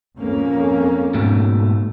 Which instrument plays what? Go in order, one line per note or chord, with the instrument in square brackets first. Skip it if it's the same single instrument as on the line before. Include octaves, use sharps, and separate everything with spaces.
[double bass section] F2 A#3 C#4
[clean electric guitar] G#2 B2 A3